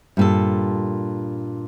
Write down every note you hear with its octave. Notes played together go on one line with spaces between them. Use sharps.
G2 A#2 A4